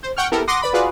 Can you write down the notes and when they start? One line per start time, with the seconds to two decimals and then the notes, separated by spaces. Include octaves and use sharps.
0.03 C5
0.17 F#5 G5 C#6 F6
0.32 B3 E4 G4 A4 A#4
0.48 F#5 C6 D6 D#6 A#6
0.62 B4 D5 B5
0.73 F4 F#4 G#4 B4 D5 F5